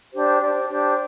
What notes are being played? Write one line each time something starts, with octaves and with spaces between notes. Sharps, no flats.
D4 G4 C5
D4 G4 C5
D4 G4 C5